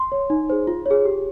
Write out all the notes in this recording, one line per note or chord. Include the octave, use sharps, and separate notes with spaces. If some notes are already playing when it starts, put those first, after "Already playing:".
Already playing: C6
C#5
D#4
G#4 C5
F4
G#4 C#5
G4